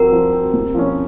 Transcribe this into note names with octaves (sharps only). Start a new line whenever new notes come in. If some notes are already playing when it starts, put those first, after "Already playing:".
Already playing: F3 C4 F#4 A#4
F3
C4 F#4
C3
F3 A#3 C#4